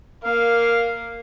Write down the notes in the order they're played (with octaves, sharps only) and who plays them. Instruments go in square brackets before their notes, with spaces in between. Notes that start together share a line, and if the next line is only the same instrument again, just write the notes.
[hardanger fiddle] A#3 [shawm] F5